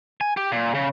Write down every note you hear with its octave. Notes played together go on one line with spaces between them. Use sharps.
G#5
G4
A#2
C#3